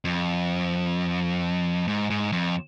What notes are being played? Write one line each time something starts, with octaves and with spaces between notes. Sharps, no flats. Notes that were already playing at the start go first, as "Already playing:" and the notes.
F2
G#2
G#2
F2